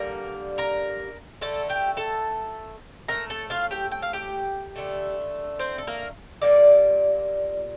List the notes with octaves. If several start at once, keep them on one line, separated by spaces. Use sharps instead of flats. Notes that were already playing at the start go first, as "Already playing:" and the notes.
Already playing: D3 G3 A#3 A#4 A#5
A#4 A#5
D3 A3 A4 A5
G4 G5
A4 A5
A2 A3 A#4 A#5
A4 A5
F4 F5
G4 G5
G5
F5
G4 G5
D3 A3
C4 C5
A4
A#3 A#4
A#2 G3 A#3 D5